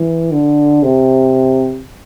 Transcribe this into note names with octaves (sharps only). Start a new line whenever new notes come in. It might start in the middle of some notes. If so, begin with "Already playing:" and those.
Already playing: E3
D3
C3